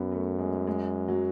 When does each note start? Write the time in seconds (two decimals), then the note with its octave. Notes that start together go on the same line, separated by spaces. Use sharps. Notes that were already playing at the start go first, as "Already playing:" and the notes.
Already playing: F#2 B3
0.12 A3
0.39 G#3
0.67 G#3
1.08 F#3